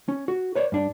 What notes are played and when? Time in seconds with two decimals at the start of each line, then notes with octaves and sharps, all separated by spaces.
0.08 C#4
0.28 F#4
0.55 B4 C#5 D5
0.72 G2 D4